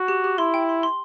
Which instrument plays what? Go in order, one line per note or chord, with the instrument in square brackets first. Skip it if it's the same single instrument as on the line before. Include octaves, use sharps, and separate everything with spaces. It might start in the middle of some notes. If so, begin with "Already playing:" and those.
Already playing: [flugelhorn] F#4
[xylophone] G4
G4
[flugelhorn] E4 [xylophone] C6
[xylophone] G5
C6
C6